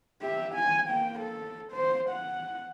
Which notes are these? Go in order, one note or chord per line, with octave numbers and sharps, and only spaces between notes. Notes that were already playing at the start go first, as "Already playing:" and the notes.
G4 E5
G#5
A#3 G5
A4
C5
F#5